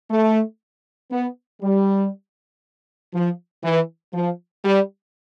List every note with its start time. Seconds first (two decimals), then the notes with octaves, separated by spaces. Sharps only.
0.10 A3
1.11 B3
1.62 G3
3.14 F3
3.64 E3
4.14 F3
4.65 G3